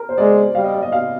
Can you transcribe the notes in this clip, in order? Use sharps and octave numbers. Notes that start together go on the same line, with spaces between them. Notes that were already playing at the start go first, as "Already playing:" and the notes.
Already playing: A#4
C5
G#3 D5
G3 F5
D#5
D5
D#5
F5